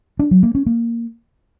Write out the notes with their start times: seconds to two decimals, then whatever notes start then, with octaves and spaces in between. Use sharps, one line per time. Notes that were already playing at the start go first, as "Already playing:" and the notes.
0.19 D4
0.31 F#3
0.43 A#3
0.55 C#4
0.66 A#3